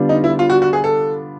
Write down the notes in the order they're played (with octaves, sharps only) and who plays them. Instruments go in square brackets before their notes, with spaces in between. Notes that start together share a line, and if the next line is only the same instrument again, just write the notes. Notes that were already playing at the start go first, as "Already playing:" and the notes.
Already playing: [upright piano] D3 G3 B3 D4 F4
[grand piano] D#4
E4
F4
F#4
F#4
G#4
A4